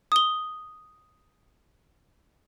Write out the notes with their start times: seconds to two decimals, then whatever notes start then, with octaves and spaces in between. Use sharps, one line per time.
0.12 D#6 G7